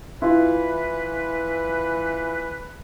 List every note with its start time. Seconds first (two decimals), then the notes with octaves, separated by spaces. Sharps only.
0.22 E3 E4 F4 B4